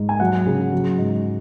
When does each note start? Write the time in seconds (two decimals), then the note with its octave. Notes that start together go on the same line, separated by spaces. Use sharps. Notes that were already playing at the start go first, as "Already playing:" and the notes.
Already playing: G#2
0.09 G#5
0.20 F#3 F#5
0.46 C#3
0.73 F#3
0.98 G#2